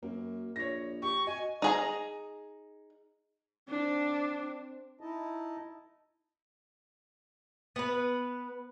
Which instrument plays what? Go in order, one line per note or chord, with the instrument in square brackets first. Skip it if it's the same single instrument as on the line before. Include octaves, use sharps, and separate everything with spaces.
[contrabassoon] F#2 [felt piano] A#3
[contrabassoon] A#1 [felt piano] C#5 A#6
[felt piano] G4 [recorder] C#6
[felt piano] F#4 [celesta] D#5 [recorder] G#5
[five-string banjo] D#4 G#4 A#5
[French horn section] C4 [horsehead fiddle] D4
[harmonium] D#4 E4 D#5 A5
[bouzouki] B3 B4